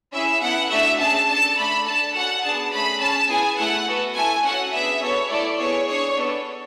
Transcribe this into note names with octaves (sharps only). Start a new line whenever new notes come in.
C#4 E4 G#4 E5
B3 E4 A4 F#5
A3 D4 F#4 A4 E5
C#4 G#4 A5
D4 A4 A5
A3 D4 A4 B5
D4 A4 A5
C#4 F#4 A4 F#5
B3 D4 G#4 A5
A3 C#4 G#4 B5
C#4 G#4 A5
B3 E4 G#4 G#5
A3 E4 A4 F#5
B3 F#4 A4
A3 E4 A4 G#5
C#4 F#4 A4 F#5
B3 D4 G#4 E5
B3 F#4 A4 C#5
A3 E4 A4 D5
B3 E4 G#4 C#5
D4 G#4 C#5
B3 D4 A4